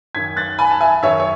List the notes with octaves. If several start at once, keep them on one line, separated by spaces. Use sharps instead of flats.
F#2 D#3 G#6 B6
F#6 A6
G#5 B5
A5
E5 G#5
F#2 D#3 C#5 E5
C#5